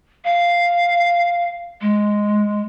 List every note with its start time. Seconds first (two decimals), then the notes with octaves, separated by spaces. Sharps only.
0.25 F5
1.81 G#3